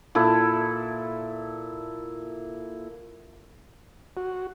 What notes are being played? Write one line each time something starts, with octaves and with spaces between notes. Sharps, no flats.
A#2 E4 A4
F#4